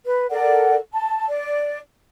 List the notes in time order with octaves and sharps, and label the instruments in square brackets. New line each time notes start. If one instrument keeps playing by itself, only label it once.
[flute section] B4
A4 A#4 D5 F#5
A5
D5